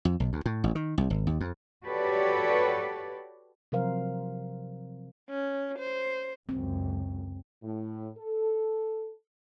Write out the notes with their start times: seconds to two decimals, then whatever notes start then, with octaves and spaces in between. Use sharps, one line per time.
0.05 F2
0.20 B1
0.33 D2
0.46 A2
0.64 A1
0.75 D#3
0.98 C2
1.10 G#1
1.27 D#2
1.41 F2
1.84 F#4 G4 A4 B4 C#5 D5
3.72 C3 F3 F#3 A#4 C5 F5
5.30 C#4
5.79 C5
6.49 C#2 F#2 C4
7.63 A2
8.17 A4